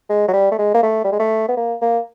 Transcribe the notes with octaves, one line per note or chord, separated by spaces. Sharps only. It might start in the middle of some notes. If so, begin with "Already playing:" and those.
G#3
F#3
G3
A3
G#3
A#3
A3
G3
G#3
A3
B3
A#3
A#3